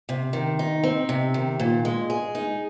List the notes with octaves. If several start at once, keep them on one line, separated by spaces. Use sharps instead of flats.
C3
D#3
D#4
C4
C3
D#3
A#2
G#3
G#4
D#4